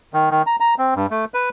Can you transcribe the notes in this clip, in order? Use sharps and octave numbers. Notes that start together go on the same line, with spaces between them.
D#3
D#3
A#5
A#5
C4
G2
A3
B4